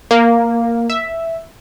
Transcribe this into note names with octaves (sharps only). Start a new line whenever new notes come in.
A#3
E5